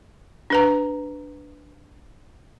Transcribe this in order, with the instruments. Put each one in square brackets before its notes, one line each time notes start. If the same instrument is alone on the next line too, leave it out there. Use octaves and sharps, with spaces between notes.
[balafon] D4 B4 A#5